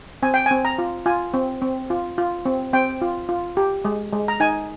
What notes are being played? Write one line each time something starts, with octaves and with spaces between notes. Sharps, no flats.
C4 G#5
G5
C4 G#5
A#5
F4
F4 G#5
C4
C4
F4
F4
C4
C4 G5
F4
F4
G4
G#3
G#3
A#5
D#4 G#5